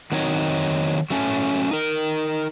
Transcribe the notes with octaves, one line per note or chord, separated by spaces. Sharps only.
D#3 F#3 C4 D#4 C#5 D#5
F#3 A3 C#4
D#4 A#4